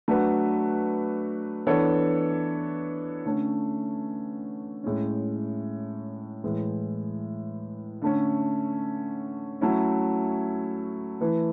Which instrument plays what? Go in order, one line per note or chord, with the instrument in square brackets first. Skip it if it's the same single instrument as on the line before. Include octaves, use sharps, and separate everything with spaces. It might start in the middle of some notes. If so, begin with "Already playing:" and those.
[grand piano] F#3 A3 D4 F#4 B4
E3 B3 D4 A4 C#5
D3 A3 C#4
A2 G#3 C#4
A2 E3 G#3
D3 A3 C#4
F#3 A3 C#4 E4
E3 A3 E4 B4